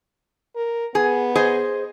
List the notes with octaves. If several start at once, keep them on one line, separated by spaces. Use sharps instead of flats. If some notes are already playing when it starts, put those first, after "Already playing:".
A#4
B3 G#4
G#4 C5 D#5